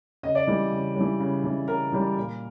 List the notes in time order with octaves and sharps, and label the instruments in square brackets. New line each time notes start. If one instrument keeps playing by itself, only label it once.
[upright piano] C#3 D#5
D5
E3 G3
C#3
G3
E3
C#3
E3 G3
C#3 A#4
E3 G3
A#2